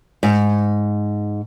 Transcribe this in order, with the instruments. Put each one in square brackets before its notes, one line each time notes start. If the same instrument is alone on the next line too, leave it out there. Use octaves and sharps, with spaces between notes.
[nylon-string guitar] G#2